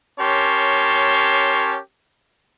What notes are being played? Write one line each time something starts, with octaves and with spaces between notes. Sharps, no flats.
C#4 G4 A#4 C#5 A5 C6